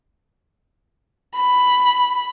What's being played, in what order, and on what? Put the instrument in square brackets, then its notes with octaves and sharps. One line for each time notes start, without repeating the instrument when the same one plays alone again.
[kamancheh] B5